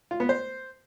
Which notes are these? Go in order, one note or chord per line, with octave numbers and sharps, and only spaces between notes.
F4
B3
C5